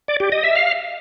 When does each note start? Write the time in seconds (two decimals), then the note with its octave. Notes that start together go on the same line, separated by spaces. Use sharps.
0.08 D5
0.20 G4
0.32 D#5
0.44 E5
0.56 F5